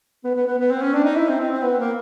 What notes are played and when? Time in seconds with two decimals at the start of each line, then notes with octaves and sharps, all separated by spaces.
0.24 B3
0.35 B3
0.47 B3
0.59 B3
0.70 C4
0.82 C#4
0.93 D4
1.04 D#4
1.16 E4
1.28 C4
1.40 C4
1.51 C4
1.62 B3
1.79 A#3